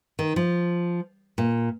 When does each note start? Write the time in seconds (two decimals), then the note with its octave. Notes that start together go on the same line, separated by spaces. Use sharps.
0.19 D#3
0.36 F3
1.38 A#2